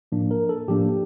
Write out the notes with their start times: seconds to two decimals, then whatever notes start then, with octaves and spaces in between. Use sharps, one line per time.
0.12 A2 F3 A#3 D4
0.31 A#4
0.49 A4
0.68 A2 F3 A#3 D4 G4